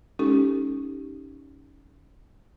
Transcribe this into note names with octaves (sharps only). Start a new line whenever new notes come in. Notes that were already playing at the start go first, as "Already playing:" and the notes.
G#3 C#4 D#4 G4 A4